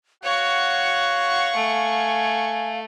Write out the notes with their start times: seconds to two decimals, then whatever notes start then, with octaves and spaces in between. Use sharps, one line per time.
0.24 F#4 C#5 F5 F#5 C#6
1.56 A3 G#5